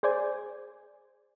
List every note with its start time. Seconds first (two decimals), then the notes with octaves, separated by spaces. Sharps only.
0.03 G#4 C5 D5 G#5